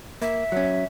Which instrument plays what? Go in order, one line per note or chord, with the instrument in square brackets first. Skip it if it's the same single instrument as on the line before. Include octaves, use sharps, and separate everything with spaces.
[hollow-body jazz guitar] A#3 [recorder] E5
[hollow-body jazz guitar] F#3 C#4